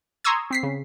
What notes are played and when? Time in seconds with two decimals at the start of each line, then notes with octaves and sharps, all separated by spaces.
0.24 A#5 C6 C#6 D#6 E6 G#6
0.51 C4 B6 C7
0.63 C#3